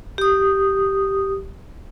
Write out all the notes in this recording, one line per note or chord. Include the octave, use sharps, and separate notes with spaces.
G4 D#6